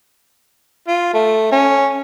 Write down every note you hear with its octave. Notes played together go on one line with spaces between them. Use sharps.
F4
A3
C#4